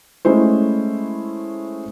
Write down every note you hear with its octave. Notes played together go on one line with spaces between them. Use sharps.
G#3 A3 C#4 E4 C5